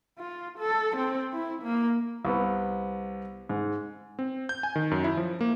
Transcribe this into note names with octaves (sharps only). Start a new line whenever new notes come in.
F4
A4
C4
E4
A#3
C2 B3
G#2
C4
G6
G#5
D#3
F#2
E4
F3
A#3